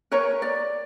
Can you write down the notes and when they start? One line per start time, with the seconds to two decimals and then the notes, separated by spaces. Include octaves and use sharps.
0.11 A#4 B4 C#5 A#5
0.42 D5